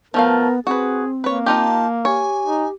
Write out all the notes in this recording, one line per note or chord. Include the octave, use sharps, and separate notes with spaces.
F3 A3 B3 A#4 F5
C4 F#4 G#4 B4
A#3 B4 C#5
D#4 F4 G4 A5
G4 C#5 G#5
D#4